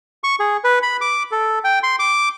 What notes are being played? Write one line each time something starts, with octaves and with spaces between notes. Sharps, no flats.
C#6
G#4
B4
B5
D6
A4
G5
C6
D6